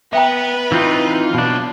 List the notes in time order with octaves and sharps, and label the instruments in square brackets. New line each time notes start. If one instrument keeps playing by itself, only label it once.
[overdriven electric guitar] B3 [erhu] B4 [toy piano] E5 G5 A#5
[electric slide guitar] E3 C4 D#4 [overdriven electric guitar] F4
[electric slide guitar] B2 D4 [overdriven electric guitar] F#3 F5